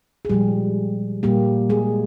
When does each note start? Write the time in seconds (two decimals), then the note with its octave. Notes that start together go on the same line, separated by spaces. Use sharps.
0.25 G#4
0.29 A#2 F3 G3 G#3 G4
1.23 A#2 G3 A#3 G4
1.70 G#3 G#4